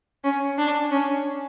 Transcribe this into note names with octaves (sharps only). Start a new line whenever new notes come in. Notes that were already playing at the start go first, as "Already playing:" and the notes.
C#4
D4
C#4